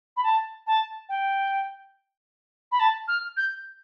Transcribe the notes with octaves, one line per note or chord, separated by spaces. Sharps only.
B5
A5
A5
G5
B5
A5
F6
G6